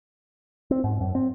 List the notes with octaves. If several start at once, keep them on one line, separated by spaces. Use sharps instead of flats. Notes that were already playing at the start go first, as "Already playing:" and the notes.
C4
G#2
F#2
C4